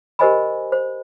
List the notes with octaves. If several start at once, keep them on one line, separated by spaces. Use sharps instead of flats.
G4 A#4 C5 D#5 G#5 B5
C5